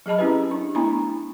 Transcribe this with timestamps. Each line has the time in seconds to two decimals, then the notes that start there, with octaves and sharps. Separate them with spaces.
0.06 F#3 G#4 D#5 A5 B5
0.18 C4 C#4 E4 G4 B4
0.51 D4
0.75 A3 B3 D4 E4 A#5 B5